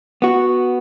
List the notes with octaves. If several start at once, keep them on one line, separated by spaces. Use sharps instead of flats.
B3 F#4